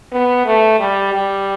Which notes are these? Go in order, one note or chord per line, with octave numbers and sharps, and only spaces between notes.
B3
A3
G3
G3